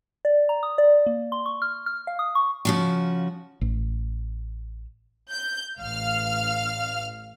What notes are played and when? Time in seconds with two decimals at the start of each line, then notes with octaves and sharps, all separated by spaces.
0.25 D5
0.49 A#5
0.63 D#6
0.78 D5
1.06 A#3
1.32 C6
1.46 C#6
1.62 F6
1.86 F6
2.07 F5
2.19 D#6
2.35 C#6
2.65 C#3 F3 F#4
3.61 A1
5.31 G6
5.80 A1 F5 F6